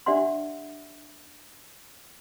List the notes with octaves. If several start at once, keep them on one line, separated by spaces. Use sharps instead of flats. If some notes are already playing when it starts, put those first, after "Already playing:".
D4 G4 D5 E5 F#5 C6